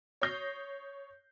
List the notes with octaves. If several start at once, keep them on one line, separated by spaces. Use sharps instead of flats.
C#5 D#6 G6 A#6 C7